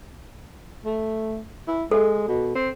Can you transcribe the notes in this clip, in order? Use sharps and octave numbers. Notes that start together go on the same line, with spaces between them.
A3
E4
G#3 A4
B2
C4